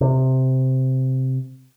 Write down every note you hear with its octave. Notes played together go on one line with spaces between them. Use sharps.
C3